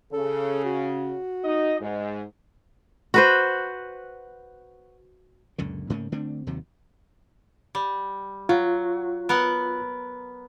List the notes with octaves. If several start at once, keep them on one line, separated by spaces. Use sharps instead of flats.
C#3 A4
F#4
D#4 D#5
G#2
F#4 B4 C5
C#2 F#2 A#2 D3
G#2 C#3 A3 A#3
D3 A3 C4 D4
D#2 C3 D#3 F#3
G3
F#3 F4
B3 A#4 F#5